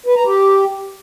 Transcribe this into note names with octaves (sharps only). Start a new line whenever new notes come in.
B4
A#5
G4